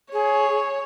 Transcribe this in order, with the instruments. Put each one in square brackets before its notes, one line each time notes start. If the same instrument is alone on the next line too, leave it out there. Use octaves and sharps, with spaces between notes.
[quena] G#4 [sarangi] C#5